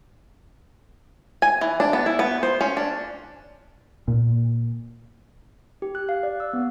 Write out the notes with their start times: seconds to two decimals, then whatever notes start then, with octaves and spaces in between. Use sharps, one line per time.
1.42 G#5
1.61 E3
1.80 D4
1.93 B3
2.06 E4
2.19 B3
2.43 C5
2.61 C#4
2.77 D4
4.08 A#2
5.82 G4
5.95 F#6
6.09 F5
6.23 D5
6.40 E6
6.53 B3